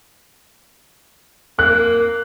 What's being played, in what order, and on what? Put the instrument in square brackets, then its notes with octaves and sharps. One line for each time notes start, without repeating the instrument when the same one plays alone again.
[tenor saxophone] A#3 [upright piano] F#6